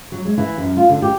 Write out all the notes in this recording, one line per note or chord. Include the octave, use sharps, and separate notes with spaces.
F#3
G#3
E3
F#2
F4
D3
G4